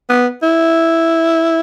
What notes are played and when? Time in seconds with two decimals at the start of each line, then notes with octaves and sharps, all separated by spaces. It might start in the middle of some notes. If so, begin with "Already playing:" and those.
0.10 B3
0.43 E4